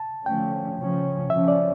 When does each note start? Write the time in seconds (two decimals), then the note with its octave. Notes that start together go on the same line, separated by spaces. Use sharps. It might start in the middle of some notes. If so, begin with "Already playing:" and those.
Already playing: A5
0.26 D3 F3 A3 C#4 G5
0.78 C#3 F3 C#4
1.30 C#3 F3 C#4 E5
1.48 D5